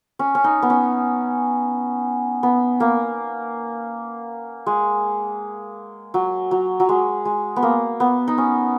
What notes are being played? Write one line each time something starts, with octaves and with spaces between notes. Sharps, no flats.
C#4
C#4
D#4
B3
C#4
B3
A#3
G#3
F#3
F#3
F#3
G#3
G#3
B3
A#3
B3
D#4
C#4